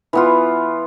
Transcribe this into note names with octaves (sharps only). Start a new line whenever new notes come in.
E3 B3 F4